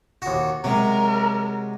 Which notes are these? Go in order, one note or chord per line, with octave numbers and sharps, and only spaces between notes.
D#2 F#4
C3 F#3 G#3 A#4